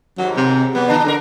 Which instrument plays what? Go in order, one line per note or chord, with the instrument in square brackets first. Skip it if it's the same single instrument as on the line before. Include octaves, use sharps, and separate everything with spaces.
[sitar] D#2 G#2 [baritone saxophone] F#3
[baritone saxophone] C3
[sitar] F#3 [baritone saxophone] B3
[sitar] D3 D4
[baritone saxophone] D3 [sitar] F#3 A#4